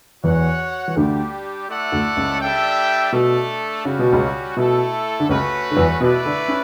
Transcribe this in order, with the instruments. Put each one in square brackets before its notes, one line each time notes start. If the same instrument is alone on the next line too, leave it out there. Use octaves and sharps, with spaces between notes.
[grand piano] E2 E3 [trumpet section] F#4 C#5 F#5
[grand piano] E3
[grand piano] D2 D3 [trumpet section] G3 D4 G4
[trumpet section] A3 E4 A4 D5 F#5
[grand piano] D2 D3
C#2 C#3
[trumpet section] G3 D4 A4 E5 G5
[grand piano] B2 [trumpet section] A3 D4 A4
[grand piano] C#3 [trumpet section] G3 C#4 F#4
[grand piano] B2
C#2 C#3
[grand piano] B2 [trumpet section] A3 E4 A4
[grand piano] D3
[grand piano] C#2 C#3 [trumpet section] A3 C#4 F#4 B4
[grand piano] D3
E2 E3
[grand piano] B2 B3 [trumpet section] A3 E4 B4 D5
[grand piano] D3 D4
C#4